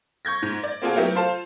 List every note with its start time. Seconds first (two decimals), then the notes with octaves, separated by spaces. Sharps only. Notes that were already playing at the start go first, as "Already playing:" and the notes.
0.25 C#6 G6 G#6 A#6
0.43 G#2
0.63 D5
0.82 A#3 C4 F4 F#4 G#4 A4
0.96 F#3 A3 B3 E4 G4 A#4
1.15 F4 A4 C5 F5 A5